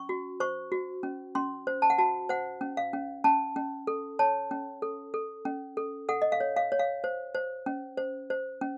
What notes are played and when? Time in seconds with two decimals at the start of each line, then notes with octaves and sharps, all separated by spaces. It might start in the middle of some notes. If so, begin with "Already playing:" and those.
Already playing: C#4 C#6
0.09 F#4
0.40 C5 C#6
0.72 F#4
1.03 C#4
1.35 C#4 C6
1.67 C5
1.82 A5
1.90 F#5
1.98 F#4 A5
2.29 C5 F#5
2.61 C#4
2.77 F5
2.93 C#4
3.24 C#4 A5
3.56 C#4
3.87 A4
4.19 C#5 A5
4.51 C#4
4.82 A4
5.14 A4
5.45 C#4
5.77 A4
6.09 A4 F#5
6.22 D#5
6.32 F5
6.40 C#5
6.56 F5
6.72 C#5
6.79 F5
7.04 C5
7.35 C5
7.66 C#4
7.97 C5
8.30 C5
8.61 C#4